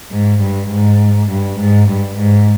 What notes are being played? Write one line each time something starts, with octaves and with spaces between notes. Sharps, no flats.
G#2
G2
G#2
G2
G#2
G2
G#2